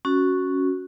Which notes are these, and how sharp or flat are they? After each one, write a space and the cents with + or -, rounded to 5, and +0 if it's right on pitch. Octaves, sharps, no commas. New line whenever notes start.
C#4 +0 F#4 +0